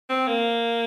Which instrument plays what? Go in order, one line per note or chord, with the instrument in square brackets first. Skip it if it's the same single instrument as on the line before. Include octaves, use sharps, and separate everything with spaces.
[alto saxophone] C4
A#3